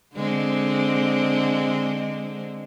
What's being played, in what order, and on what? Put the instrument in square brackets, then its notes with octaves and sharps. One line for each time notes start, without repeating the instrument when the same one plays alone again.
[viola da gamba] D3 G#3 C4